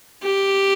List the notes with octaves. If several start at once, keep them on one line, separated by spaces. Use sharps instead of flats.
G4